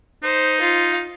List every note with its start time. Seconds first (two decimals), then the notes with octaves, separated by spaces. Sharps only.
0.23 D#4 C5
0.60 F4